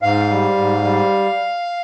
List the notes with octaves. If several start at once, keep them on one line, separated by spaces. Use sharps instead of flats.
G#2 F5
G3
G#2
G3